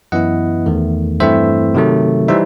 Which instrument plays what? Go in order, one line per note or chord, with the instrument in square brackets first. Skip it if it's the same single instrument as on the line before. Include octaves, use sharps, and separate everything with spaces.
[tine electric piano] F#2 E3 B3 E4 D#5 F#5
E2 D#3 A3
G2 E3 A3 C4 E4 C5 E5
C3 D#3 F#3 A3
E3 G3 D#4 C5 E5